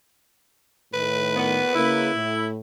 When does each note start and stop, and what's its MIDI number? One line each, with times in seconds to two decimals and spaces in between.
0.94 1.61 45
0.94 1.61 51
0.94 2.12 71
1.36 1.72 46
1.36 1.72 59
1.75 2.09 49
1.75 2.09 58
1.75 2.46 64
2.15 2.60 45